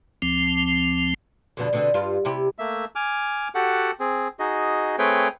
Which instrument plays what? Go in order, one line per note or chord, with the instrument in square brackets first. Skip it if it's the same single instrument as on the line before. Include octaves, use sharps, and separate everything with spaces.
[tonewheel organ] D2 F3 C4
[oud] F2 B2 D3
B2 D3 C4
G2 F4
C3 E4 G4
[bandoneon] A3 A#3 E5
G#5 D6 F6
F#4 G4 A4 F#5
C4 G#4
D#4 F#4 G#4 D#5
A3 C4 G#4 B4 C#5 G5